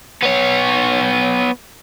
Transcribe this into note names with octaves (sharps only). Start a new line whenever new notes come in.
B3 C#5